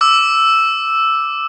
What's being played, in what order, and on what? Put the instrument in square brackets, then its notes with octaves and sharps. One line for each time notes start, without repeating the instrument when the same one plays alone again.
[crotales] D6 E6